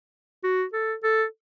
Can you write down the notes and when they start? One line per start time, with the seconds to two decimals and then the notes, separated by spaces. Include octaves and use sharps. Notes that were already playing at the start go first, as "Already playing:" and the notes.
0.44 F#4
0.73 A4
1.03 A4